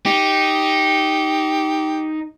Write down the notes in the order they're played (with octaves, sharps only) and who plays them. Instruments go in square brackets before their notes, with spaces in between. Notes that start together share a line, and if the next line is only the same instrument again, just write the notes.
[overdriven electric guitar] D#4 [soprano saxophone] G4